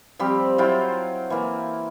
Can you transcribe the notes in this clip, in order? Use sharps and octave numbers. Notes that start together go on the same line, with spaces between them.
F3 G3 C4 G4
F#3 E4 F4 G5
E3 A#3